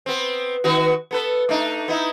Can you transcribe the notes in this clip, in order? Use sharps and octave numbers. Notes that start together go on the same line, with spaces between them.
B3 C4
D#3 B3 F#4
B3 A4 B4
A3 D4 D#4
B3 D#4 E4